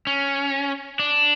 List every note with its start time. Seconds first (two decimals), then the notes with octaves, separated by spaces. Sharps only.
0.07 C#4
0.99 D4